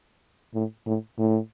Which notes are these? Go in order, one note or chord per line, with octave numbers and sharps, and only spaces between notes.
A2
A2
A2